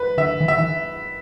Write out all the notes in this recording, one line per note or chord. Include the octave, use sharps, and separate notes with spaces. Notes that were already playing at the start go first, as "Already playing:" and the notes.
Already playing: B4
D3 E5
D#3
E5
D#3